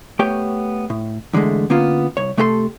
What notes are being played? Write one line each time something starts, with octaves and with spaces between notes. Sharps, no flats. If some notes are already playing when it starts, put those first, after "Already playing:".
A3 B3 G4 C#5 G5
A2
E2 D3 F#3 G#3 A3
D3 A#3 B3 C#4 F4
C2 C#5
C3 A3 G4 A4 F#5 C6